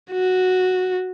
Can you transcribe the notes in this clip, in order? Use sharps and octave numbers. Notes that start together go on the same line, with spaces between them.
F#4